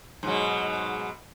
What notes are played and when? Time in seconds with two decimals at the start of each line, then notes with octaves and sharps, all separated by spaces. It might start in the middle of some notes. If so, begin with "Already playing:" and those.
0.23 G#2 B2 F#3